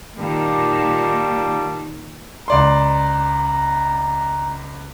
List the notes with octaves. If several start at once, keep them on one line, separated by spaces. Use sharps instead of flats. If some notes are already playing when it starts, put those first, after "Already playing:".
A#2 D#3 G3 A#3 A5
C#2 D5 A#5 C6